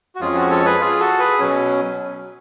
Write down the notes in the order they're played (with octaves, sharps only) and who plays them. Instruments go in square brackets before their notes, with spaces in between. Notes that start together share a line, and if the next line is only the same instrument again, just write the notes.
[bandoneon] F#4
F2 F3 G#3 C#4 F4 G#4
F#4
A4 C#5
G#4 B4
F4 G#4
F#4 A4
G#4 B4
B2 F#3 C#4